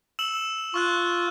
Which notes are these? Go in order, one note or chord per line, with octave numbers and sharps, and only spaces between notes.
E6 E7 F#7
F4 C#6 F6 F#6